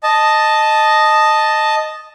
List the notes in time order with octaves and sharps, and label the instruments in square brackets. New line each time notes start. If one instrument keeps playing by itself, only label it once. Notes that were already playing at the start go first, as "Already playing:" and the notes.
[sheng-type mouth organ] D#5 A5